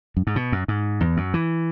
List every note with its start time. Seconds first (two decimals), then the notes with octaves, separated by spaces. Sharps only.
0.17 F#2
0.27 G#2
0.36 B2
0.52 F#2
0.68 G#2
1.01 E2
1.17 F#2
1.34 E3